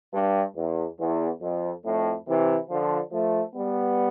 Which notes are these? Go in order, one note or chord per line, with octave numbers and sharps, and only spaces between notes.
G2
E2
E2
F2
F2 A2
C3 E3
D3 F3
F3 A3
G3 B3